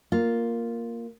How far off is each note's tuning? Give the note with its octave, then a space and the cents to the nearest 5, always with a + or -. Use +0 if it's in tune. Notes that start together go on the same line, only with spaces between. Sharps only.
A#3 +0 F4 +0